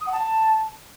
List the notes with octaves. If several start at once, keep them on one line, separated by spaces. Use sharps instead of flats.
D#6
F#5
A5